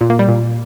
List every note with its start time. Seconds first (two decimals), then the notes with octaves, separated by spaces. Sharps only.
0.01 A#2
0.10 A#3
0.19 G3
0.28 A#2